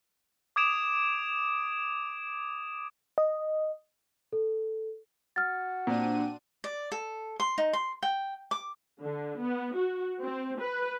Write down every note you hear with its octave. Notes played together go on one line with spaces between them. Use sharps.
D6 D#6 G#6 D7 E7 F7
D#5
A4
F#4 F6 A6
A#2 C4 D4 D#7
D5
A4
C6
D#4
C6
G5
D6
D3
B3
F#4
C4
B4